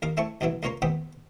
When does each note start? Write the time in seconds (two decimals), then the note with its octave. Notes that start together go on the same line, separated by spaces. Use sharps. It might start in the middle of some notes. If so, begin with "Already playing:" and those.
0.02 D#2 A#4 F5 D6
0.17 A3 C4 E4 A5 C#6
0.41 C2 B2 E3 F#3 E4
0.63 C#2 A#3 F4 C#5 A#5 C6
0.82 D#2 B3 C4 G5 B5